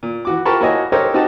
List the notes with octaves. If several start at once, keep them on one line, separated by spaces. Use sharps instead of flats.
A#2
E3 F#4 D6
F4 G4 A#4 A5 B5 C#6
A#3 E4 F#4 C#5 D#5 G#5
G4 A4 A#4 C5 C#5 D#5
C4 D#4 F#4 G4 D#5 A5